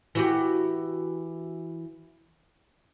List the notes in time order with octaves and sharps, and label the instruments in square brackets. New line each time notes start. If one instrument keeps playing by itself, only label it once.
[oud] E3 F#4 G4